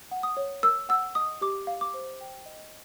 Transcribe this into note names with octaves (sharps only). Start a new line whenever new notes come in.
F#5
D#6
C#5
A#4 E6
F#5 E6
D#5 D#6
G4 D6
F5
D6
C5
G5
D#5